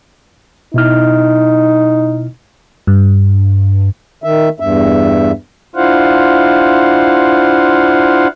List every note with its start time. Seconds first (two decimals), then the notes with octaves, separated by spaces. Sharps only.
0.74 B2 D#4 E4 F6
2.87 G2
4.24 D#3 E5
4.60 E2 G2 E5
5.75 D4 E4 F4 C5 F5 F#5